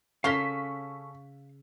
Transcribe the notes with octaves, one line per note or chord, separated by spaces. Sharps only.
C#3 C#4 A4 F5 A#5 C6 C#6 B6